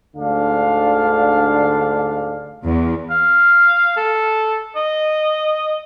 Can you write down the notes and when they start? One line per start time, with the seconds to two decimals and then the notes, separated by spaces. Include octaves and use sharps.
0.16 D2 G#2 D3 D4 F5
2.63 E2
3.11 F5
3.96 A4
4.76 D#5